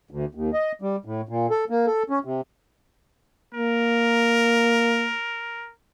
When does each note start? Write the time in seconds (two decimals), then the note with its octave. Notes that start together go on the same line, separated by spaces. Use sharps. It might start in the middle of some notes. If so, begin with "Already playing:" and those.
0.11 D2
0.35 D#2
0.53 D#5
0.82 G3
1.05 A2
1.29 A#2
1.50 A4
1.70 A#3
1.87 A4
2.10 C#4
2.24 C3
3.54 A#3 A#4